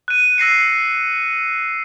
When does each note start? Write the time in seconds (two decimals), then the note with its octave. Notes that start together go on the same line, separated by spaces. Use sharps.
0.08 F#6 D#7
0.38 E6 A#6 C7 C#7